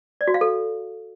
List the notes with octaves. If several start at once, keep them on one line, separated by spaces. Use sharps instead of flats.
D5
F#4
F5
A4